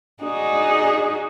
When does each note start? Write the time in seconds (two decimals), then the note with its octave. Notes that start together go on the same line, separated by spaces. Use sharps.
0.23 D#4 F#4 G#4 D5 D#5